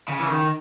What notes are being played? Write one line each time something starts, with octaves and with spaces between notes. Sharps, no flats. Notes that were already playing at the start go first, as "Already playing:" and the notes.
C#3
E3
D#3